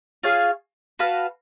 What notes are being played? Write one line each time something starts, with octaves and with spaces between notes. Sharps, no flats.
F4 G#4 C#5 F5
F#4 B4 F5 A5